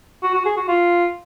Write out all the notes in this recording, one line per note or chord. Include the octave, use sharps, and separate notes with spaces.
F#4
F#4
G#4
F#4
F4